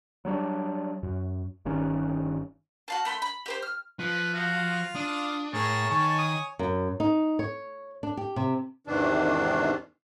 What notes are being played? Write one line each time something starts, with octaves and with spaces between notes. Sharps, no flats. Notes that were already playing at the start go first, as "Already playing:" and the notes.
F#3 G3 A#3 D4
F#2
G1 G2 D#3 C#4
F#4 F5 A5
A3 B5 C6
B5
G4 B4 C5
F6
F3 B4
F4 F#4 F5
D4 D#6
A2 G#4 A#4 C#5 A5
D#3 C#5 G#5 C#6
D#6
F#2
D#4
C#5
D4
G4
C3
E2 G#2 C3 D#3 E3 D4